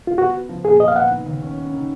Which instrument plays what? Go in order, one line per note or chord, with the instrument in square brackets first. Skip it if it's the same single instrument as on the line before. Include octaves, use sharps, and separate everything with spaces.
[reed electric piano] F4
[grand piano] B3 [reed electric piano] F#4
[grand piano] B3
F3
[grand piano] A#2 [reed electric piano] G#4
[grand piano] B3 [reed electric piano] D#5
[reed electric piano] F5
[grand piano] B3 [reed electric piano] F#5
[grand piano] D#3
D#2
C#4
C#4
D#3